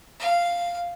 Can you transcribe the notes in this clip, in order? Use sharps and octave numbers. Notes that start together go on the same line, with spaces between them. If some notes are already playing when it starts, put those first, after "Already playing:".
F5